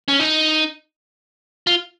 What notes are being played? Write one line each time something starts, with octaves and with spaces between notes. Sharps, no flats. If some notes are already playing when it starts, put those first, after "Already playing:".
C#4
D#4
F4